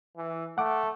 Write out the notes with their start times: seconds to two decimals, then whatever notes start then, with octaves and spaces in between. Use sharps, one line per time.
0.17 E3
0.58 A3 F#5 D6